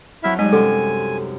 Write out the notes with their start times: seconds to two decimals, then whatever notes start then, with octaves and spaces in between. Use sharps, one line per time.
0.23 F2 F#3 E4 E5 F6
0.39 G3 G#3 D#4 G#5
0.53 F#2 C3 C#4 A4